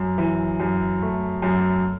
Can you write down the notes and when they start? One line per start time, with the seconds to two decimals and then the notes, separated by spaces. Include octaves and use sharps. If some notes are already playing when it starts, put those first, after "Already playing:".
Already playing: F#2
0.18 E3
0.60 F#2
1.02 A3
1.42 F#2